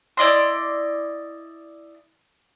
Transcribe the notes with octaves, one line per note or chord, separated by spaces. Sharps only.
E4 D5 D#5 C6